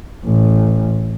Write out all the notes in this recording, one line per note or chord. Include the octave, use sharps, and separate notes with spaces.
A1